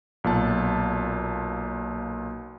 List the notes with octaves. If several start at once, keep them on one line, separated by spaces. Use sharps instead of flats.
B1 A#2 A5